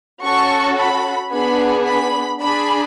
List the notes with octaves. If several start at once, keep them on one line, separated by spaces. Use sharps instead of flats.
C#4 F#4 A4 C#6
B5
B3 D4 G#4 B5
B5
D4 G#4 B5